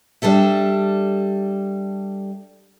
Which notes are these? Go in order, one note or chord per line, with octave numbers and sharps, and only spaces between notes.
G3 D4 A4 E5